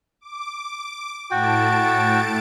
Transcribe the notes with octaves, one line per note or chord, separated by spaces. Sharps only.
D6
A2 F#4 G5 A5 D7